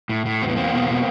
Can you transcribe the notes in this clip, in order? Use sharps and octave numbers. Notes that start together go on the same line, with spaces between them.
A2
A2
E2 C4
B3
E2 A#3 C4
B2
B2